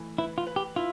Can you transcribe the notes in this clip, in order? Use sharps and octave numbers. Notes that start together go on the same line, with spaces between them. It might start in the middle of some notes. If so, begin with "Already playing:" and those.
Already playing: E3 A3
E4 B4
F4
B4
G4
E4 F4